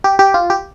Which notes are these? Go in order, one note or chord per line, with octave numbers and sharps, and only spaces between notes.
G4
G4
F4
G4